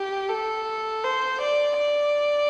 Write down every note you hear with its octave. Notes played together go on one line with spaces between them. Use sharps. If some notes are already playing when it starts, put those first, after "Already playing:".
Already playing: G4
A4
C5
D5
D5